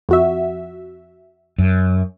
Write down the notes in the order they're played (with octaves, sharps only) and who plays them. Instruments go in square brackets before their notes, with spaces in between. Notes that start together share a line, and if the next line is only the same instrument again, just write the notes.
[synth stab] F2 F#4 E5
[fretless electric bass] F#2